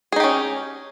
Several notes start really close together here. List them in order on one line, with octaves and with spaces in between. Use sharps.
G#4 D#4 G4 C#4